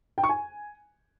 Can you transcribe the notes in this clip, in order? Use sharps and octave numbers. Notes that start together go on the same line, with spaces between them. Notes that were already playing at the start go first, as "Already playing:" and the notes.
G5
C#6
G#5